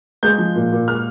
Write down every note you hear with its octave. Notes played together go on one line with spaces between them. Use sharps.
G#3 G6
F3
A#2
A#2
G#3 F6